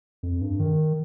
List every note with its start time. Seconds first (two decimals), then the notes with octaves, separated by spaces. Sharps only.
0.23 F2
0.41 G2
0.60 D#3